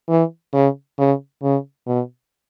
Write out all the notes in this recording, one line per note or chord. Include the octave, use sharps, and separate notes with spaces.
E3
C#3
C#3
C#3
B2